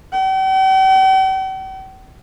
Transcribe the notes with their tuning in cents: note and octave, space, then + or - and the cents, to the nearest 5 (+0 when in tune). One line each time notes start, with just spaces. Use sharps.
G5 -45